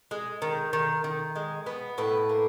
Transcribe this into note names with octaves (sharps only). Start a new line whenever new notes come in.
G#3
D#3
D#3
D#3
G#3
B3
A2 B4
A#3